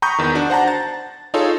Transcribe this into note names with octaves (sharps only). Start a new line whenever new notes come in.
A#5 B5 C#6 D#6 G6
E2 D#3
D4 F#4
C5 F#5 A5 A#5
A6
D#4 F4 G#4 A4 C#5